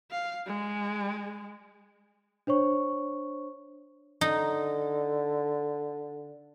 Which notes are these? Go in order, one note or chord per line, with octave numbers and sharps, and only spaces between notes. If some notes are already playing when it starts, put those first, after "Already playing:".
F5
G#3
D4 C5 C#5 C#6
D3 D#4